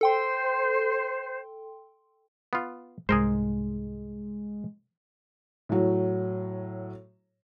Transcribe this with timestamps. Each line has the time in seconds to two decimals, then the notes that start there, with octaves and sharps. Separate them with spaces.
0.01 A4 C5 G5 C6
2.53 B3 F4
3.09 C2 G#2 G#3 G#4 A#4 C5
5.69 A2 F#3